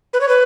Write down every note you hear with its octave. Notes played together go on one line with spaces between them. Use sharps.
B4
C#5
B4